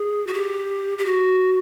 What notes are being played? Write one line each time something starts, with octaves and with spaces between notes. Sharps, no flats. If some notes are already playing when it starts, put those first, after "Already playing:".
Already playing: G#4
F#4
G4
G4
F#4